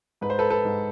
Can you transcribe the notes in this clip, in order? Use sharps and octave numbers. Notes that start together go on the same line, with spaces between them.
G#2 B4
C5
A4 B4
A4 B4
G#2